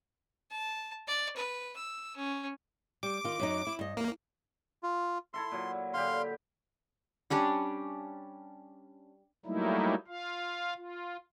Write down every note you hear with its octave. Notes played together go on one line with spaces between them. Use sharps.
A5
D5
B4
E6
C#4
G3 D6
D#3 F4
F#2 F#3 D#4
E4
G2 D#5
E2 A#3
F4
E4 A4 E5 C6
A#2 F#3
D3 G4 F5 C6
G3 C#4 D4 G4
F#3 G3 A3 A#3 D#4 E4
F4 F5
F4